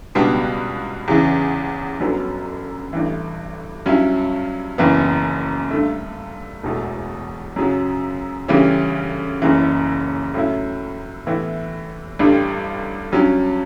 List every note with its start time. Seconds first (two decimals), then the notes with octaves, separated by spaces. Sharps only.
0.15 C#2 B2 G3 B3 D4
1.08 E2 C#3 E3
2.00 G1 F#2 D3 F#3 B3
2.93 A1 G2 E3
3.86 G2 F#3 C#4 E4
4.78 F#1 F#2 E3 B3
5.71 G2 D3 A3
6.63 E1 E2 B2 A3
7.56 F#2 C#3 F#3
8.48 D2 C#3 E3 G3 C#4
9.42 F#1 F#2 C#3 E3
10.34 A2 F#3 C#4 E4
11.27 A2 E3 B3 E4
12.19 A1 G2 D3 G3
13.12 G2 F#3 C#4